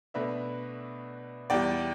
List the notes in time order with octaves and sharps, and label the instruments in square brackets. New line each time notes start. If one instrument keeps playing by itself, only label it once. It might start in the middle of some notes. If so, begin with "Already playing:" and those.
[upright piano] B2 A3 D4 B4 E5
E2 E3 G3 D5 G5